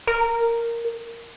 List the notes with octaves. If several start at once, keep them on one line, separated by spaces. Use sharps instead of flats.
A#4